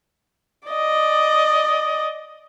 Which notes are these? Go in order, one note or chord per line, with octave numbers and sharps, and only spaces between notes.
D5 D#5